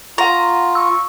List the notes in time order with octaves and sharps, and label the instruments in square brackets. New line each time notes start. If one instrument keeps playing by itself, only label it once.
[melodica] F4 [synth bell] F#5 C#6 [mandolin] A#5
[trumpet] C#6 [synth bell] E6